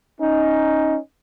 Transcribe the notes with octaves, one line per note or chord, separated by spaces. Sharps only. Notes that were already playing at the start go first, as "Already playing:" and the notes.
C#4 D#4